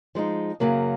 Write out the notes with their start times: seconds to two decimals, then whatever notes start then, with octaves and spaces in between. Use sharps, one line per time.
0.15 F3 G#3 D#4
0.60 F#2 C#3 F#3 A#3